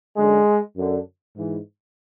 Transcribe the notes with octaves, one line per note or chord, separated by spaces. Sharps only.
F#2 D3 G#3
F#2 D3
G#2 E3